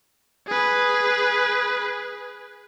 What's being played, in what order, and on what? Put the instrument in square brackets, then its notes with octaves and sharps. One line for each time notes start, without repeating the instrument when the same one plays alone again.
[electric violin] G#4 B4